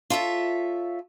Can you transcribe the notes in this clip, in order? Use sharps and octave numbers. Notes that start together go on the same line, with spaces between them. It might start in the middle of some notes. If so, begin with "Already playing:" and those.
F4 A4 C#5 E5